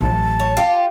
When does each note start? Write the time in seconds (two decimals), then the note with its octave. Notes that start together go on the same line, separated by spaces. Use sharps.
0.01 A1 F#3 A5
0.40 C#5
0.57 F4 G4